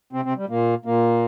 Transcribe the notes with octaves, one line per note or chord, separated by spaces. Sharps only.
C3 C4
C3 C4
G3
A#2 A#3
A#2 A#3